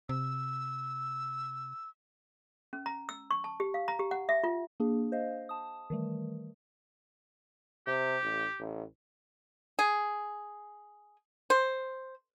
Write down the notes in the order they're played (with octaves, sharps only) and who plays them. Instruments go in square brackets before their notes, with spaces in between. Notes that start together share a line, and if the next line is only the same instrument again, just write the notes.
[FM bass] C3 [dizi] E6
[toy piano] C#4
A#5
E6
C#6
A5
G4
F5
A#5
G4
F#5
E5
F4
[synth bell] A#3 D4 G#4
C5 D#5 F5
A5 D#6
D#3 E3 G3 A3
[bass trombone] C3 [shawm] G4
[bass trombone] A1
A1
[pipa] G#4
C5